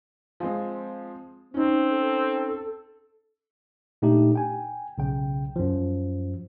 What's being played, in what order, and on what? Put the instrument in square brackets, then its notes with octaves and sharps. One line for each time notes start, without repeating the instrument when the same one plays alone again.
[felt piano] F3 G#3 C4
[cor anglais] C4 [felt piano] C#4 D#4
[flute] A4
[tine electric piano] A#2 A3 D4 D#4 G4
G5 G#5
B1 C#3 G5
F#2 F3